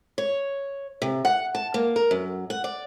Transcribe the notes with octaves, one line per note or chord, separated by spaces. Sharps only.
C#5
C3
F#5
A5
A#3
A#4
F#2
F#5
D5